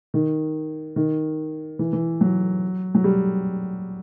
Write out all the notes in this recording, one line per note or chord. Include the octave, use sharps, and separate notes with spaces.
D#3
D#3
E3
E3
F#3
F#3
G3